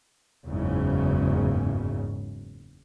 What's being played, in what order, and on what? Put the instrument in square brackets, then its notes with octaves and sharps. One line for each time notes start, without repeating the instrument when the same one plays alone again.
[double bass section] F#1 E2 G#2 C#3